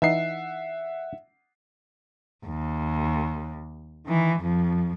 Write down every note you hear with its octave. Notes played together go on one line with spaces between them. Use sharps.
E3 D#4 E5 F#5 C7
D#2
D#3 E3
F2 F3